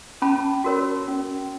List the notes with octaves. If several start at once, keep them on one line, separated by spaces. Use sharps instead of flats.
C#4 A5 B5
F#4 A#4 C#5
C#4